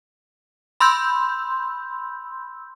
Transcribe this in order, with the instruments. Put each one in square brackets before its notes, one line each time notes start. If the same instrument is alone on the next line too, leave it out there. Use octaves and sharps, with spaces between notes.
[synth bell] B5 C6 E6 G6